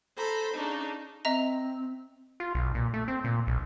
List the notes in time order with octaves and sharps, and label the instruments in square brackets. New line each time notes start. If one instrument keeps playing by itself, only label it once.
[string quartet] A4 C5 A#5 B5
C#3 D4 D#4
[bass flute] C4 [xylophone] D#5 E5 A#5
[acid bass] F4
B1
A#2
A3
C4
A#2
B1